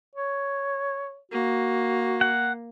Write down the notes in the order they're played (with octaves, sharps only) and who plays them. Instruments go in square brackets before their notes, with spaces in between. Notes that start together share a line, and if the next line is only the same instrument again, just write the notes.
[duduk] C#5
[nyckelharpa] A#3 [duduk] F#4
[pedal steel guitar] F#5